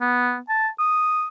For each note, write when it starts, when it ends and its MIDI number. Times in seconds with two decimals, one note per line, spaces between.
0.01 0.38 59
0.49 0.68 81
0.79 1.27 87